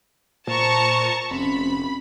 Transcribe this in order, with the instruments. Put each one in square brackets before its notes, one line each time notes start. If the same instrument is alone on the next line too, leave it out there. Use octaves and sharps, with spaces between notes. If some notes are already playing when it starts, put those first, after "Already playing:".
[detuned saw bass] A#2 [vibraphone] C5 [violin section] A5 A#5 C#6
[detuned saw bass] F1 [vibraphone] C4 C#4 [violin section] B5